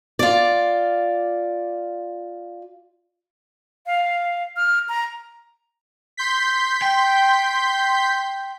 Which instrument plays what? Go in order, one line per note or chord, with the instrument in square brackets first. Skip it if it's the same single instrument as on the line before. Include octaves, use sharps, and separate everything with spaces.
[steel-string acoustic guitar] F4 D5
[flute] F5
F6
A#5
[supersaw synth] C6 G6 B6
[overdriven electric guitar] G5